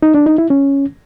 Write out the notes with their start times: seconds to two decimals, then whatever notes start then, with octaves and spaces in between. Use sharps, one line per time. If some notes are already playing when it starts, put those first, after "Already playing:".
0.02 D#4
0.14 D4
0.26 D#4
0.38 E4
0.50 C#4